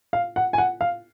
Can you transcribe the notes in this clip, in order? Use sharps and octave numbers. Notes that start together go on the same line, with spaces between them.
F5
F#5
G#5
F#5
F5